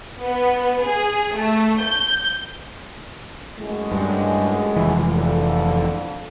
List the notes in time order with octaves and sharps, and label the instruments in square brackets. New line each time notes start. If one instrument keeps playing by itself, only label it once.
[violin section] B3
G#4
A3
G6
[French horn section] F#2 A2 G#3
[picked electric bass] G2
F1 E3
[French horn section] F2 D3 A4